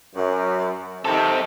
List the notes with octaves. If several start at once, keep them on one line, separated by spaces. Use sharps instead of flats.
F#2
C3 D#3 C4 A4